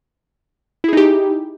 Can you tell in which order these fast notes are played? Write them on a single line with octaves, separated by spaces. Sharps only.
E4 G#4 D#4 G4